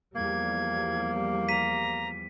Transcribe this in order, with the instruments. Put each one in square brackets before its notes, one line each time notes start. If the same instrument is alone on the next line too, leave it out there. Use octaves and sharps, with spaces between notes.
[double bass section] E2 F3 G3 [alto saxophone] A#3 [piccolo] G#6
[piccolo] A#5 [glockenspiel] B6 D#7